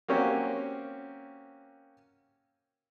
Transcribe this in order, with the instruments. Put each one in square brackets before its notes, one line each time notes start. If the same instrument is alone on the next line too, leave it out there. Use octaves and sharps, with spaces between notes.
[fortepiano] A#3 C4 C#4 F#4 G4